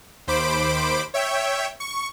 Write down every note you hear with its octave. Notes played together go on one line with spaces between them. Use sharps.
D#2 C5 B5 D6 D7
C#5 E5 G5
C#6